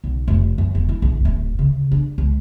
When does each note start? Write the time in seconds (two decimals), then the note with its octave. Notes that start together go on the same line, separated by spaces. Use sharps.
0.04 B1
0.28 F1
0.58 F#2
0.75 E1
0.89 E4
1.02 A#1
1.25 D1
1.59 C#3
1.92 D4
2.18 C#2